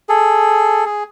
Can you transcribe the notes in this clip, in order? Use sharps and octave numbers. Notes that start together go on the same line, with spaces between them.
G#4 A4
G#4